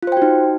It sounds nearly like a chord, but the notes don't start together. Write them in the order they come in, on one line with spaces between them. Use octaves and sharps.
F4 C5 G5 F#4 D#4